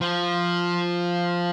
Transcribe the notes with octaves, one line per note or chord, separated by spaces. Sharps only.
F3